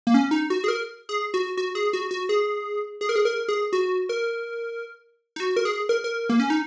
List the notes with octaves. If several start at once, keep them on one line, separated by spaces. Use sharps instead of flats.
A#3
C#4
D#4
F#4
G#4
A#4
G#4
F#4
F#4
G#4
F#4
F#4
G#4
G#4
A#4
G#4
A#4
G#4
F#4
A#4
D#4
F#4
A#4
G#4
A#4
A#4
A#3
C#4
D#4